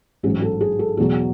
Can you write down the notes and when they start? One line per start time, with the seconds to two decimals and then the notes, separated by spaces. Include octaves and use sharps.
0.23 A1 G#2 F#3 G#4
0.42 A4
0.61 G#4
0.79 A4
0.97 E2 B2 F#3 G#4